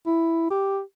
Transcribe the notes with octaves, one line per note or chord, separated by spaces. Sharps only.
E4
G4